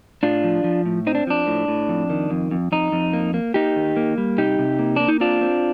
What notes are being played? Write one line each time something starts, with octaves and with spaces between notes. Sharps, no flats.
A2 D4 F4
F3
F3
A2
C4 D#4
D4
F3 D4
A2
A2
F2
D#3
F2
F2
F2 D#4
F2
A#3
A#3
A#3 D#4 G4
D#3
A#3
G3
C3 D#4 G4
C3
A#3
A#3 D4
D#4
C4 D4 F4
C4